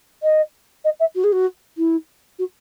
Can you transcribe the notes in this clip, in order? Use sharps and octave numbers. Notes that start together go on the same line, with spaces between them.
D#5
D#5
E5
F#4
G#4
F#4
E4
F#4